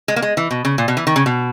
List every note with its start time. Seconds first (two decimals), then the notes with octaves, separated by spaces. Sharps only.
0.08 G#3
0.16 A#3
0.22 G#3
0.37 E3
0.51 B2
0.65 C#3
0.78 A#2
0.88 B2
0.97 E3
1.07 D#3
1.16 C#3
1.26 B2